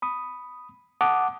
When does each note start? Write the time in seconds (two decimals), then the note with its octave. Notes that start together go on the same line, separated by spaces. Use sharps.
0.02 B5 D#6
1.01 F#5 A5 D6 D#6